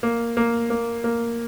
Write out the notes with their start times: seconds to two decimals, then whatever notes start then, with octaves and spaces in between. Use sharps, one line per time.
0.03 A#3
0.37 A#3
0.70 A#3
1.04 A#3